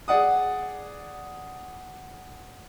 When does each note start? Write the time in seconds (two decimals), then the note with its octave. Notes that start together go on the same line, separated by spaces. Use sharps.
0.08 G#4 D5 F#5 D#6